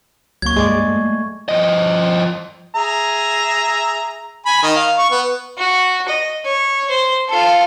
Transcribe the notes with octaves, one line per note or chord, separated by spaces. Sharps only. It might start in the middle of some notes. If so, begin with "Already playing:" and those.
C#2 F#3 A#3 C#6 G#6
G2 G#3 D5
A3
F3 D#5
G#4 E5 A#5
G#5 B5
D#3 D#5
F5
C#6
B3
F#4
D#5
C#5
C5
F4 A4